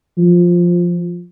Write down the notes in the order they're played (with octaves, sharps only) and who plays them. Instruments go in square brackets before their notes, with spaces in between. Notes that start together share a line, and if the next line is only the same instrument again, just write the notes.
[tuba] F3